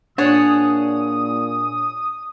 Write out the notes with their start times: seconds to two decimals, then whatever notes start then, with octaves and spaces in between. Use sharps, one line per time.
0.18 A#2 D4 G#4 C#5 F#5 D#6